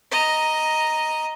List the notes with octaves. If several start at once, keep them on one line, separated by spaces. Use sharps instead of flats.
D#5 A#5